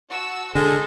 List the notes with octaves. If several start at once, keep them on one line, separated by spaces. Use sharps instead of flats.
F#4 A5 E6
D3 G#3 G#4 A4 C5